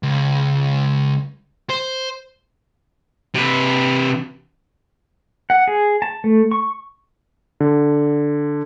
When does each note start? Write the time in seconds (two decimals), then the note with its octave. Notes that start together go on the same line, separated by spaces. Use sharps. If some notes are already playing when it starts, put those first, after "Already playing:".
0.03 C#2
1.70 C5
3.34 C3 B4
5.50 F#5
5.68 G#4
6.02 A5
6.24 A3
6.52 C#6
7.60 D3